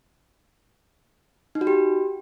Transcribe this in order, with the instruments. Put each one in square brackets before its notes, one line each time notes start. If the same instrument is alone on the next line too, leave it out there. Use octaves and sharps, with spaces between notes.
[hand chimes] D#4
F#4
G4